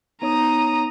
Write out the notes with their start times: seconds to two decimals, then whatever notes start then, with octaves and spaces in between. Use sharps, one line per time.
0.22 B3 D#4 C#5 A#5 D#6